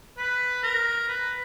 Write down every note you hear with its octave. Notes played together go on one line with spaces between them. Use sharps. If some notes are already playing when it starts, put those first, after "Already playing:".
B4
A#4
B4